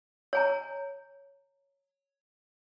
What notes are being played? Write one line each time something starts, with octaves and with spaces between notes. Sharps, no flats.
C#5 G#5 A#5